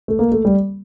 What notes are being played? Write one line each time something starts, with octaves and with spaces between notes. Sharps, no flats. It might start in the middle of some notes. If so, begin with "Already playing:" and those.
A3
A#3
A3
G3